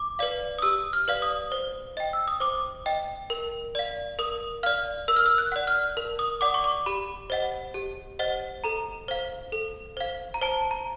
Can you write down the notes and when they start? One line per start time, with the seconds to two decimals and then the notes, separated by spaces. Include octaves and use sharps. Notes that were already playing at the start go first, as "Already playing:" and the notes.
Already playing: D6
0.19 B4 D5 F5
0.59 D#6
0.62 G4 E6
0.93 F6
1.08 B4 D5 F5
1.22 D#6
1.52 C5
1.97 D#5 G5
2.13 E6
2.28 D#6
2.40 C5 D6
2.86 D#5 G5
3.30 A#4
3.75 D5 F5
4.19 A#4 D#6
4.63 D5 F5 F6
5.08 A#4 E6
5.16 F6
5.26 E6
5.38 F#6
5.52 D5 F#5
5.67 F6
5.97 A#4
6.19 D#6
6.41 D5 F#5 D6
6.54 C#6
6.64 D6
6.86 G4 B5
7.30 C5 D#5 F#5
7.74 G4
8.19 C5 D#5 F#5
8.64 A4 A#5
9.08 C5 F5
9.52 A4
9.97 C5 F5
10.34 A#5
10.42 C5 A5
10.71 A#5